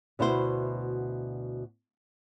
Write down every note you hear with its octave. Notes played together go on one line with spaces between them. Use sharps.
D2 B2 E4 F#4 C5